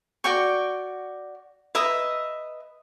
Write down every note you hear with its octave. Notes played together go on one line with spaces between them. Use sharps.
F#4 D5 G5 C#6
B4 D#5 E5 A#5